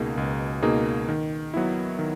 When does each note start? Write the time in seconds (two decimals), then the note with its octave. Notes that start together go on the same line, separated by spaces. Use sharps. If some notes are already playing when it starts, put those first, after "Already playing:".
Already playing: C#2 B2 A#3 D#4 G#4
0.17 C#2
0.62 B2 A#3 D#4 G#4
1.08 D#3
1.54 F#3 B3 E4
1.99 D#3